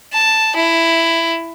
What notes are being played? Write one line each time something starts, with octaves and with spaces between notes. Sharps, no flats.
A5
E4